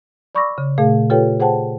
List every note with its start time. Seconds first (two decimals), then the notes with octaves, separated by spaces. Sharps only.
0.35 D5 B5 C#6 D6 E6 A#6
0.58 C#3
0.78 A#2 A3 G#4 F5
1.10 F4 G4 A4 B4 C#5 G5
1.40 G#4 C5 F#5 G5 A5